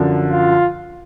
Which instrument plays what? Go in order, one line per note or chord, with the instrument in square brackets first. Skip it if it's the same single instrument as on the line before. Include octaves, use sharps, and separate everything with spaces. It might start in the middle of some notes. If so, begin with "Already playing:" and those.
Already playing: [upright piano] F#2 D3 F3
[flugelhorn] F4